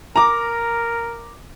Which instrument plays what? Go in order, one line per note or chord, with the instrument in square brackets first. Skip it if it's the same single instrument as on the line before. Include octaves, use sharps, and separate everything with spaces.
[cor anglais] A#4 [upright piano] A#5 D6